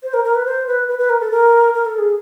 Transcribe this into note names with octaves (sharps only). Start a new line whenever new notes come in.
C5
A#4
A#4
B4
C5
B4
B4
B4
A#4
A4
A#4
A#4
A4
G#4